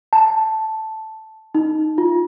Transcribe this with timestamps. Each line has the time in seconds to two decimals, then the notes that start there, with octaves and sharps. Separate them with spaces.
0.13 A5
1.55 D#4
1.98 F4